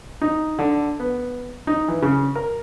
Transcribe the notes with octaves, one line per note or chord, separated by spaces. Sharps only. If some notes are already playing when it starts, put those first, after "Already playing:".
D#4
D3
B3
D#4
E3
C#3
A#4